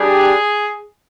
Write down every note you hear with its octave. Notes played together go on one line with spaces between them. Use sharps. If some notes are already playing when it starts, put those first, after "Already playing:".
Already playing: G3 D4 G4 G#4